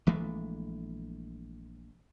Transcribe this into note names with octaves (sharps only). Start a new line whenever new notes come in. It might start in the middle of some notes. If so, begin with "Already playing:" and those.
A#1 E3 G#3 A3